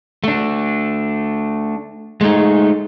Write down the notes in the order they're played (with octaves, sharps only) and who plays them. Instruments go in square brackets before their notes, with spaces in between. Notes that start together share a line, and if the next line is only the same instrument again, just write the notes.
[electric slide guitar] A3 D4
G#3 A3 D#4